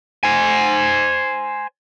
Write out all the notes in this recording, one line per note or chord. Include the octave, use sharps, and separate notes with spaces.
C5 G#5